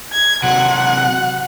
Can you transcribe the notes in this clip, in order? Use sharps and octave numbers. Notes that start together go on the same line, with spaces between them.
G#6
C3 F#3 F#5